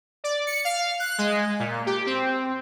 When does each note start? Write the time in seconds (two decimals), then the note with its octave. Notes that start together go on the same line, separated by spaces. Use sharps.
0.24 D5
0.47 C#7
0.65 F5
0.99 F#6
1.18 G#3
1.60 A#2
1.86 G4
2.06 C4